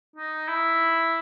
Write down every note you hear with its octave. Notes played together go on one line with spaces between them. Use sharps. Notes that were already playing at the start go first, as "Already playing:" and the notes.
D#4
E4